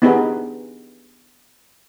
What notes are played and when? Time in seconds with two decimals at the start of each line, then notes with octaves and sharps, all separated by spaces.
0.02 B3 D4 D#4 G4 G#4 B4